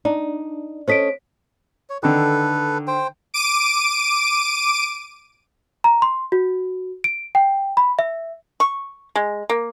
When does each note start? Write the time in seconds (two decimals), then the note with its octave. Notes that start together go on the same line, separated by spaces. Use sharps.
0.05 D4 D#4
0.88 C#4 A4 C5 D#5 B6 D7
1.89 C#5
2.03 D3 D#3 A4 B4
2.87 C5 G5
3.34 D6 D7 D#7
5.84 A#5
6.02 C6
6.32 F#4
7.04 D7
7.35 G5
7.77 B5
7.99 E5
8.60 C#6
9.15 G#3
9.50 A#3